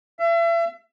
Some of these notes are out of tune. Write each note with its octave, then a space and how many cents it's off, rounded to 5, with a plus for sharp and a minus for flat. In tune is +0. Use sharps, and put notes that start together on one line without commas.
E5 +35